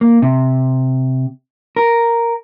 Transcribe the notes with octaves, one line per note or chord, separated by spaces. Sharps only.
A#3
C3
A#4